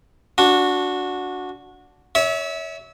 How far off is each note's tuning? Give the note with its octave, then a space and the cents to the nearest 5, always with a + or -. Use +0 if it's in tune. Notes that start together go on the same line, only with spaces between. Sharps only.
D4 -15 F#4 -15
C#5 +30 E5 -25